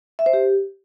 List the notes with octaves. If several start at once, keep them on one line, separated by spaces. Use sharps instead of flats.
E5
C5
G4